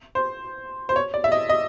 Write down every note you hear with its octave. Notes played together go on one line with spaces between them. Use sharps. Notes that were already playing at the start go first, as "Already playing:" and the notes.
C5
C5
C#5
D5
E5
D#5
D#5